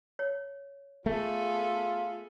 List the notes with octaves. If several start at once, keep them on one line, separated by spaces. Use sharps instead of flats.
C#5
A3 B3 F4 G#4 A4